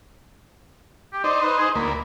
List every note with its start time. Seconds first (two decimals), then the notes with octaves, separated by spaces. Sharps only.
1.13 G4
1.24 D#4 C5 D5
1.43 B4
1.58 G#4
1.75 D2 A#3 B5